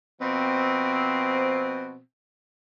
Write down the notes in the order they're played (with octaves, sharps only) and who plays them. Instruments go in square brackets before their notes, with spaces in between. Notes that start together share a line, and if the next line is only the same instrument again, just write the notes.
[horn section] B2 F3 C4